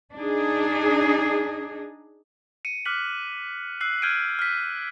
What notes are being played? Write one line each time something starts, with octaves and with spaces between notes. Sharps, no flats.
D4 D#4 G#4
C#7 D#7
D6 F6 F#6 B6 F#7
E6 F#6 C7 F#7
F6 G6 G#6 C7 D7 D#7
F6 B6